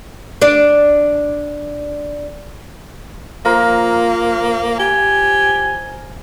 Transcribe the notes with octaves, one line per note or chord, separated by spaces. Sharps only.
D4 D5
F3 A#3 A#4 C6
G4 G#5